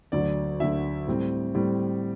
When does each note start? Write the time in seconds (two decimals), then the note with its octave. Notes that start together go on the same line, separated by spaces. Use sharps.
0.12 D2 D3 F#3 D5
0.60 D2 D3 F#3 E5
1.08 A2 G3 C4
1.55 A2 G3 C4